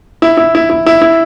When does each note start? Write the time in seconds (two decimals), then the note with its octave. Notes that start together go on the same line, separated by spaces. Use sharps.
0.22 E4
0.38 E4
0.55 E4
0.70 E4
0.87 E4
1.02 E4